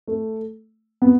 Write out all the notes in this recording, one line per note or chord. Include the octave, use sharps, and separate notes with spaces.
A3
B3